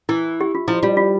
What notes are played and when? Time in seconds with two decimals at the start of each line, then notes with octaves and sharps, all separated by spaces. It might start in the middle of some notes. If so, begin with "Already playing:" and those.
0.09 E3 E4
0.41 G4
0.55 F4
0.68 F3 E4
0.83 G3 F4
0.97 F4